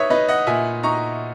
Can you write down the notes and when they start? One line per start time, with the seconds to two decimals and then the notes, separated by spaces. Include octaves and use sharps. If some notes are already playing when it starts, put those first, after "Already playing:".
Already playing: D#4 B4 C#5 D#5 E5
0.10 D#4 B4 D#5
0.28 D#5 F#5
0.47 A#2 E5 G#5
0.83 D#4 A#5 C#6